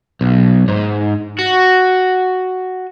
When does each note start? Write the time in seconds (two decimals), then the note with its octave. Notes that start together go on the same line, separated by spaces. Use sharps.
0.21 B1
0.68 G#2
1.39 F#4